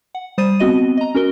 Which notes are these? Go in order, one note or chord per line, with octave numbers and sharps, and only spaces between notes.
F#5
G3 C5 D#6 A6 D#7
B3 C4 F#4 D#5 D#7
D#5 A#5
C#4 F#4 A#4 G7